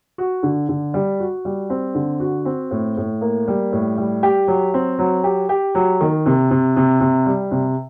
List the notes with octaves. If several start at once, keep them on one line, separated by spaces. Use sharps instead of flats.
F#4
D3
D3
G3
F#4
G3
C4
D3
F#4
C4
A2
A2
A#3
G3
A2
G3
G4
F#3
C4
F#3
G4
G4
F#3
D#3
C3
C3
C3
C3
G3
C3